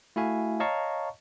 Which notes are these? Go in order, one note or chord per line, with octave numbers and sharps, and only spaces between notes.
A3 E4 F#4 E5 F5 G#5
C#5 D#5 F5 A5 A#5 C#6